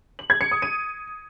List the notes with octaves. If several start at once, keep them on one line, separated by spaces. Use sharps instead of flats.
F#7
G#6
C#7
D#6
D#7